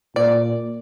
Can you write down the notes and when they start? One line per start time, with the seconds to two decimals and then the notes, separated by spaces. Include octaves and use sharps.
0.16 A#2 D5